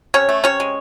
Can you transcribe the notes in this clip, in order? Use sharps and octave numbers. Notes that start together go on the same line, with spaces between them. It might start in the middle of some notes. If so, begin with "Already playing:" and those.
C3 C#4 C#5
A3
C3 C#4 C#5
G#3